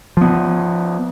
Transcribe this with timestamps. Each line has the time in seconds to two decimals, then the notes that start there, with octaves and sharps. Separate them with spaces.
0.17 F3 B3